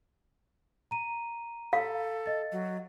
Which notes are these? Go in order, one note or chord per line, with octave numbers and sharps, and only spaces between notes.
A#5 D#7
A4 F5
D#5 A6
F#3